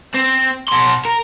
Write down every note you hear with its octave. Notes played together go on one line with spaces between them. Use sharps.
C4
B2 C6
A#4